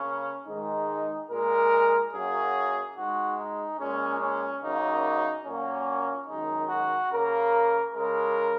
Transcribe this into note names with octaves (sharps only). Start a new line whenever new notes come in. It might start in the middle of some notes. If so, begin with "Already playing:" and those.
Already playing: C#3 A#3 C#4
G#2 D#3 G#3 D#4
A#2 G#3 A#4
F#2 F#3 A#3 G#4
G#2 G#3 F#4
D#4
A#2 G#3 C#4
C#4
F#2 C#3 A#3 D#4
A#2 F#3 A#3 C#4
F#2 D#3 G#3 D#4
F#4
C#3 A#3 A#4
C#3 G#3 A#4